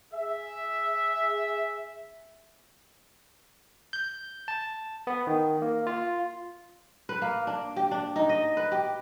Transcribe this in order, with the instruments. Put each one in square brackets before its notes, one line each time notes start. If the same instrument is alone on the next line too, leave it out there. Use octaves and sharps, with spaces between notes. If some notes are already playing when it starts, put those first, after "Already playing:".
[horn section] G#4 E5
[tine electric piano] G6
A5
B3
D#3
A#3
F4
[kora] B4
A#3
D4
G4
D4
D#4
D#5
B4
G4